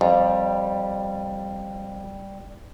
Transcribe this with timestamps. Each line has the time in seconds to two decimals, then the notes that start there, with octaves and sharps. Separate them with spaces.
0.01 F2 G3